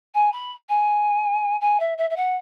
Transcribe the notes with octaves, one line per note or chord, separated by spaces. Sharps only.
G#5
B5
G#5
G#5
E5
E5
E5
F#5